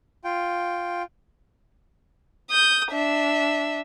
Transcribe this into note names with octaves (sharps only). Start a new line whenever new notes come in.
F4 G5
D#6 G6
D4 E5